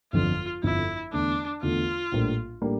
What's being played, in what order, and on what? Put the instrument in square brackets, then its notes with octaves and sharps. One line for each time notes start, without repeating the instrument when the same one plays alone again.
[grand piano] G1 F2 D3 F3 [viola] F4
[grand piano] G1 F2 D3 F3 [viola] E4
[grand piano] E2 D3 A3 [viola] D4
[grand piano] E2 D3 A3 [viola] F4
[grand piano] A#1 A2 G3 A#3 D4
A2 G3 A#3 D4